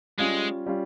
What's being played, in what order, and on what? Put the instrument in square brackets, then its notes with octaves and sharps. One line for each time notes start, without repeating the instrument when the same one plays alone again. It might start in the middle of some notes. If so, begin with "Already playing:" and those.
[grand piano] G3 C#4 F4 [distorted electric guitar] G#3
[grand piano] G3 C#4 F4